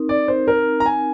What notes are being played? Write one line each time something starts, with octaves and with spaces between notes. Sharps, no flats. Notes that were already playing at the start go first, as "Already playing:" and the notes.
Already playing: C4 D#4 A#4
D5
C5
A#4
A#5
G#5